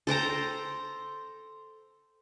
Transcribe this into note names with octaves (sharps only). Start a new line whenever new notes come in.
A4 C5 G5 A#5